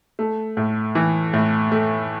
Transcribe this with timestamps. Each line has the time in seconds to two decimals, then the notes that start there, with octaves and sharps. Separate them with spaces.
0.19 A3
0.57 A2
0.95 E3
1.33 A2
1.72 A3